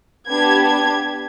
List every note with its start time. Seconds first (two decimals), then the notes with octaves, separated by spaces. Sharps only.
0.28 B3 D4 G4 G#6
0.65 G#6